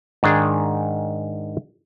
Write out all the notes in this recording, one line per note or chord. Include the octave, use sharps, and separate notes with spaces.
G#2 D#3 D4 G#4